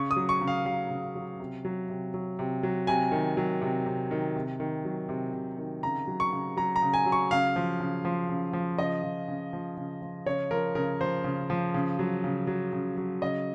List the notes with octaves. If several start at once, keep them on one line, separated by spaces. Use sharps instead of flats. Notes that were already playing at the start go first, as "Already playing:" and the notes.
Already playing: C#3 C#6
D#6
F#3
C#6
C#3
F5
F#3 F5
C#3
F#3
C3
F#3
C3
F#3
C3
F#3
C3 G#5
D#3
F#3
C3
C3
D#3
C3
D#3
F#3
C3
C3
D#3
C#3 A#5
F#3
C#6
C#3
F#3 A#5
A#5
C#3
G#5
F#3
C#6
C#3 F5
F3
C#3
F3
C#3
F3
C#3 D#5
F3
C#3
F3
C#3
F3
C#3 C#5
F3 A#4
C#3 A#4
F3 C5
C#3
F3
C#3
F#3
C#3
F#3
C#3
F#3
C#3 D#5